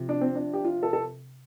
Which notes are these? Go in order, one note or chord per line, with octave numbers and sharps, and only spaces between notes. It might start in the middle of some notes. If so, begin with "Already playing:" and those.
Already playing: C3 F3
D4
C4
D4
G4
F4
A4
A4